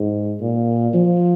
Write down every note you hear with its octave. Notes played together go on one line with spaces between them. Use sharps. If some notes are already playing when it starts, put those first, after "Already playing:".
Already playing: G#2
A#2
F3